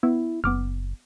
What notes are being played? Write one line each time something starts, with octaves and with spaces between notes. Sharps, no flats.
B3 E4
F#1 B3 D6 F6